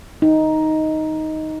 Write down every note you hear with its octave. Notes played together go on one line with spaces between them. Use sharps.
D#4